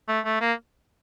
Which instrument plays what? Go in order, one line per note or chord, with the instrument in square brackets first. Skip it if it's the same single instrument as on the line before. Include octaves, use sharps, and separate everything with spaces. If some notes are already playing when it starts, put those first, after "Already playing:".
[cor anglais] A3
A3
A#3